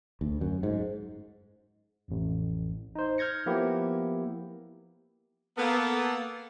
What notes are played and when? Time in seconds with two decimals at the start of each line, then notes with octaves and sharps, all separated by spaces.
0.21 D2
0.41 F#2
0.63 G#2
2.08 A1 F2
2.95 D#4 C5
3.18 F6 G6 G#6 A#6 C#7
3.46 F3 A#3 B3 E4 G4 A#4
5.57 A#3 B3 A4